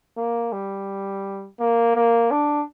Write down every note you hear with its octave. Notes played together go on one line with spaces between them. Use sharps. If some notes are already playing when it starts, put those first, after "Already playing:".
A#3
G3
A#3
A#3
D4